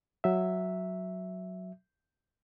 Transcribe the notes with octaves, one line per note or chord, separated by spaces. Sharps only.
F#3 E5